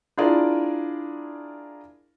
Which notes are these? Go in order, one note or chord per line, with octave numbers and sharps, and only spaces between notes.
D4 E4 F4 G#4 A#4 D5